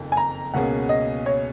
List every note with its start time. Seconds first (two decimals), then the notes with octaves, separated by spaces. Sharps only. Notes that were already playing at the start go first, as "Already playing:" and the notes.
Already playing: F#1 F2 D#3
0.12 G#5
0.17 A#5
0.54 C#2 B2 A#3 C#4 G#4 F#5
0.89 D#5
1.26 C#5